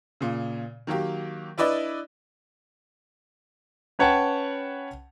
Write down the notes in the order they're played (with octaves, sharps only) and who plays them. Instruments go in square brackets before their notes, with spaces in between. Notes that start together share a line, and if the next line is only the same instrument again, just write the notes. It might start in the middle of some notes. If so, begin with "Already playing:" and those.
[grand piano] A#2 C#3
D#3 F#3 A#3 G4
D4 E4 B4 D5 D#5
C#4 B4 C#5 F#5 G5 A5